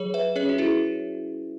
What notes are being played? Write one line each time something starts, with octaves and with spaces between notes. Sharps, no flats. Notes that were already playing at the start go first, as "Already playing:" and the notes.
Already playing: F#3 G#4 C#5
B4 E5
C#4 G#4 C#5
F#4
E4 G#4